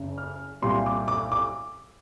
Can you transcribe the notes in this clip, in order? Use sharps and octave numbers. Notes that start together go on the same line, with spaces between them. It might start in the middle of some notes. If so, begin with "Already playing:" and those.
Already playing: F#1 C#3
F6
C2 A#2 G3 C6
D6
D6
D6